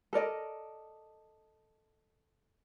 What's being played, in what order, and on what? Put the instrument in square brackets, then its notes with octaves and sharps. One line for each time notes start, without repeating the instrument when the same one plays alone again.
[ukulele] A4 A#4 D5 D#5